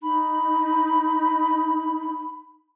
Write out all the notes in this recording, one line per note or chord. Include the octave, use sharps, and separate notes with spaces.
D#4 B5